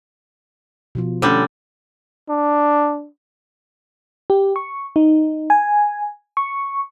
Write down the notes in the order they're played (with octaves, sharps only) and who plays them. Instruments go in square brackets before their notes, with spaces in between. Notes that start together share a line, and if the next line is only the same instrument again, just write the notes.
[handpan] B2 F3 F4
[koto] D3 G3 [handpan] A3 C#4
[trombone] D4
[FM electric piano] G4
C#6
D#4
G#5
C#6